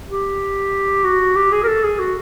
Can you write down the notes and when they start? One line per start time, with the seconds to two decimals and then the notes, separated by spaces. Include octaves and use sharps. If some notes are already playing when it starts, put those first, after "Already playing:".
0.10 G4
1.04 F#4
1.35 G4
1.52 G#4
1.63 A#4
1.68 A4
1.84 G#4
1.99 F#4